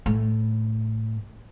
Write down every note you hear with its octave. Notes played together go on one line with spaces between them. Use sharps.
A2